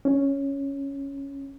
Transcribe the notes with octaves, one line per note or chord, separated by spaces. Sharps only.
C#4